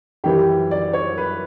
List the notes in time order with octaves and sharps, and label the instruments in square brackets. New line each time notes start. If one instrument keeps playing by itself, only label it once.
[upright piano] F#2 E3 G3 G4
D5
C#5
B4